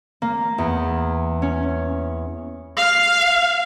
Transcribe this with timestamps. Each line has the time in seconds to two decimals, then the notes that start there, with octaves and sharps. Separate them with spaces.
0.22 A#3
0.58 E2
1.42 C#4
2.77 F5